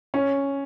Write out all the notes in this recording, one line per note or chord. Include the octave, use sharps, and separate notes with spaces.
C#4